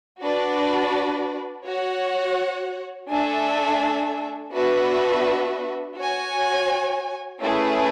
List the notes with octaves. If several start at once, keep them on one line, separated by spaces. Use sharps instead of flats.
D4 F#4 B4 D5
F#4 C#5 F#5
A3 D4 A4 E5 G#5
B3 D4 F#4 B4 E5
F#4 C#5 G#5
A3 C#4 E4 G#4 B4